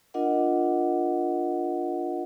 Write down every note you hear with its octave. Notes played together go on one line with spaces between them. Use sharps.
D4 F4 A#4 D#5 F#5